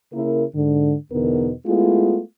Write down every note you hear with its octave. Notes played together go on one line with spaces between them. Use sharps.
C#3 A#3 E4 A#4
G#2 D3
E2 B2 D3 B3 D#4 A#4
G#3 A3 B3 E4 F4